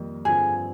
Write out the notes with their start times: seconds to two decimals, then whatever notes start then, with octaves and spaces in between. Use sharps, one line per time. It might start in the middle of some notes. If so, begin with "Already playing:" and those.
Already playing: F2 D#3 G3 A#3
0.25 G2 D3 F3 C4 F4 G#4